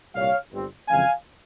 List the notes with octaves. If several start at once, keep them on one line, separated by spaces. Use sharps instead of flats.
C2 A#2 G3 A#3 C#5 F5
G1 G2 G3 C4
F2 C#3 E3 G#3 C4 F5 G#5